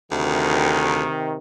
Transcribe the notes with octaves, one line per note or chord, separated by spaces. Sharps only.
D2 C3 D#3